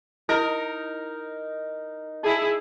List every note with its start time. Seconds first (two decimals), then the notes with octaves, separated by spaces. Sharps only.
0.29 D#4 E4 A#4
2.23 D#4 E4 G#4